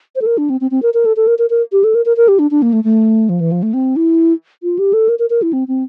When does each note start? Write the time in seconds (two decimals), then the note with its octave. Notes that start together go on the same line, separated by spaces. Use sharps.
0.16 C5
0.22 A4
0.26 A#4
0.38 D4
0.50 C4
0.61 C4
0.71 C4
0.83 A#4
0.94 A#4
1.05 A4
1.17 A4
1.27 A#4
1.39 A#4
1.50 A#4
1.72 G4
1.84 A4
1.95 A#4
2.05 A#4
2.17 A#4
2.28 G4
2.39 D4
2.51 D4
2.62 A#3
2.73 A3
2.84 A3
3.29 F3
3.40 E3
3.52 F3
3.63 A3
3.74 C4
3.96 E4
4.63 F4
4.79 G4
4.93 A4
5.09 A#4
5.19 A#4
5.30 A#4
5.42 E4
5.53 C4
5.68 C4